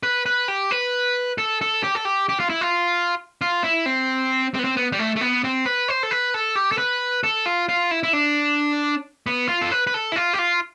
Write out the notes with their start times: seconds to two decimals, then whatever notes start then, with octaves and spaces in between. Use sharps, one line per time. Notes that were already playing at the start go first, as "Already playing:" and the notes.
0.03 B4
0.26 B4
0.48 G4
0.71 B4
1.38 A4
1.61 A4
1.83 G4
1.95 A4
2.05 G4
2.29 G4
2.40 F4
2.50 E4
2.61 F4
3.41 F4
3.64 E4
3.86 C4
4.54 C4
4.59 B3
4.64 C4
4.77 B3
4.92 G3
4.99 A3
5.16 A3
5.21 B3
5.44 C4
5.66 B4
5.88 C5
6.03 A4
6.11 B4
6.34 A4
6.55 G4
6.72 A4
6.78 B4
7.24 A4
7.46 F4
7.69 F4
7.91 E4
8.03 E4
8.13 D4
9.27 B3
9.49 F4
9.61 A4
9.72 B4
9.87 B4
9.94 A4
10.12 E4
10.16 F4
10.33 G4
10.39 F4